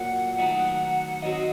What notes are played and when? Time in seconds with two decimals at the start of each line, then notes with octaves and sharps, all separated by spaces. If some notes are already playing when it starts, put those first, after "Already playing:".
Already playing: A#2 F#3 A#3 F#5
0.38 D#3 F#3 A3 D#4 F#4
1.22 D#3 F#3 C4 F#4 D#5